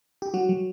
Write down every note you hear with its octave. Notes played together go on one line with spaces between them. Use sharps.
G4
F#3 F#4
F#3